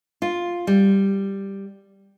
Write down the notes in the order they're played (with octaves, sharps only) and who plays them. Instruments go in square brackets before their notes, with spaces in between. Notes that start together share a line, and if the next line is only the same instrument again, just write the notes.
[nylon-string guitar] F4
G3